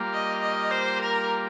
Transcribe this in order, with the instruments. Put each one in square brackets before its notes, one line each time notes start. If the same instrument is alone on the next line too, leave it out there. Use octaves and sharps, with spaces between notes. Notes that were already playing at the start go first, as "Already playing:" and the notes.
Already playing: [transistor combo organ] G3 A#3 F4
[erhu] D#5
D#5
C5
A#4